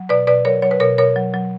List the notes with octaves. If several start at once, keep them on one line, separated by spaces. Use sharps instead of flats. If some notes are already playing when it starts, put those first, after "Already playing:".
Already playing: F#3
B2 B4 D5
B2 B4 D5
F#3 A#4 C#5
F#3 C#5
B4
B2 A#4 C#5
B2 A#4 C#5
F#3
F#3